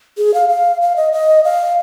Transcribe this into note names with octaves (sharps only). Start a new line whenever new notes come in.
G#4
F5
F5
F5
D#5
D#5
F5